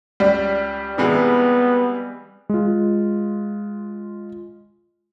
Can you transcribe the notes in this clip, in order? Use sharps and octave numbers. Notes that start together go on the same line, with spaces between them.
C#2 G3
C3 E3 G#3 B3
G#3 F4